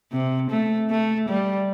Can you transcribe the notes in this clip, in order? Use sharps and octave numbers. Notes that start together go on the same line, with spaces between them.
C3
A3
A3
G3